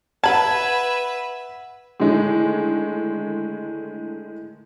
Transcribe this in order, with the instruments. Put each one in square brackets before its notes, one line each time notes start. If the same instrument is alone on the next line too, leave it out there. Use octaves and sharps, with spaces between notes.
[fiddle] B4 E5 [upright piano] F#5 G#6 [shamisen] A5 B5
[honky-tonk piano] A2 D3 D#3 G#3